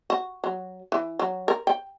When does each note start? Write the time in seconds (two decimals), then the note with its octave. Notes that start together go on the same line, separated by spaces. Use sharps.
0.10 F#4
0.44 F#3
0.92 E3
1.19 F#3
1.48 A#4
1.67 G5